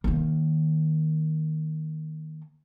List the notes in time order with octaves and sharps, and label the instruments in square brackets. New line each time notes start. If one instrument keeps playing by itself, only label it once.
[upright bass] D#3 A#3